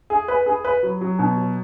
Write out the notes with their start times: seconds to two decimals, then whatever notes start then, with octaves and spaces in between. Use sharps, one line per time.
0.10 G#4
0.28 B4
0.46 G#4
0.65 B4
0.83 F#3
1.01 F#3
1.19 B2
1.38 F#3